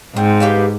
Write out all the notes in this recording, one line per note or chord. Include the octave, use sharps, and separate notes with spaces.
G#2 C4
G4 B4 F5